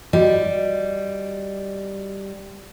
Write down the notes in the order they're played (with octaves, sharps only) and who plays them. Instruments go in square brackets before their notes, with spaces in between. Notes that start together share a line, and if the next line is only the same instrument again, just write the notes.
[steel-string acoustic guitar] G3 [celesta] F#4 D#5